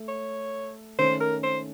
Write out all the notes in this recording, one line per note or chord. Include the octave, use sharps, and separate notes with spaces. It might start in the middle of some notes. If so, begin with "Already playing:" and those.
Already playing: A3
C#5
D#3 A3 C#4 A4 C5
A#4
C5